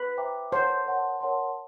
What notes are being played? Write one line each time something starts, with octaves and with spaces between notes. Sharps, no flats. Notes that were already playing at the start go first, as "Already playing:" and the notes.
Already playing: B4
C5 E5 G5 A#5 D6
A#4 C5 C#5 F#5 A5 C6
A#4 C#5 F#5 A5 C6
A#4 C#5 F#5 A5 C6